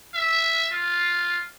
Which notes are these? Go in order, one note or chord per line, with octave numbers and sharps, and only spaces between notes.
E5
F4